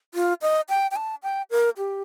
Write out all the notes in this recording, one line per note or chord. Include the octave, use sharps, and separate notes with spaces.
F4
D#5
G5
G5
A5
G5
A#4
G4